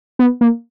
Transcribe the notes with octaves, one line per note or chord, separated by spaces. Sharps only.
B3
A#3